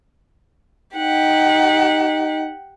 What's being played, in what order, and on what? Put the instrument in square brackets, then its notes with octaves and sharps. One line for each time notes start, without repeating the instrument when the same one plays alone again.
[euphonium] D#4 [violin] G4 F#5